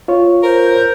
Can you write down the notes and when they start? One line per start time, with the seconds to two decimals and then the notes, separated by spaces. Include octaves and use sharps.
0.08 F4 C#5
0.43 A#4 C5